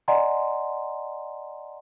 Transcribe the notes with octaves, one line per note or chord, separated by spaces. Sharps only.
D5 D#5 F#5 G#5 A#5 C6